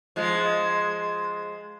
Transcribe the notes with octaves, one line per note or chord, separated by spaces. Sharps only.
F3 G#3